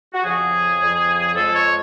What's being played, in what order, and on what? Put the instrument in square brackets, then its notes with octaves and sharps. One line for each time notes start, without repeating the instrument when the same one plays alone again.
[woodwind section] F#4
F2 C#3 F3 G#4
F2 C#3 F3
F2 F3 G#3 A4
C#5